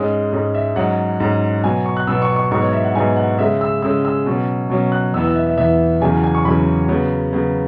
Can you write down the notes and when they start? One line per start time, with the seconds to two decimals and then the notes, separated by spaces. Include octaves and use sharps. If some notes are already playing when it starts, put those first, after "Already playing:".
Already playing: G#2 G#3 C#4
0.33 G#2 G#3 C#4
0.55 E5
0.76 G#2 F#3 C#4 F#5
1.20 G#2 F#3 C#4
1.64 B2 F#3 B3 G#5
1.85 C#6
1.97 F#6
2.07 B2 F#3 B3 E6
2.22 C#6
2.36 C#6
2.51 G#2 F#3 B3 C#6
2.62 C#5
2.73 E5
2.84 F#5
2.95 G#2 F#3 B3 G#5
3.16 F#5
3.39 C#3 G#3 C#4 E5
3.61 E6
3.82 C#3 G#3 C#4 E6
4.05 E6
4.26 B2 F#3 C#4
4.70 B2 F#3 C#4
4.92 F#6
5.13 E2 E3 B3 E6
5.24 E6
5.36 E5
5.47 E5
5.57 E2 E3 B3 E5
6.01 E2 C#3 F#3 C#4 G#5
6.24 G#5
6.35 C#6
6.45 E2 C#3 F#3 C#4 B5
6.89 C#3 F#3 B3
7.33 C#3 F#3 B3